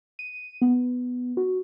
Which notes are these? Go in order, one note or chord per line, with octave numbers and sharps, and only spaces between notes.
D#7
B3
F#4